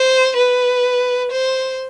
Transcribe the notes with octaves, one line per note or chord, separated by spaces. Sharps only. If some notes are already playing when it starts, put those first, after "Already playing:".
Already playing: C5
B4
C5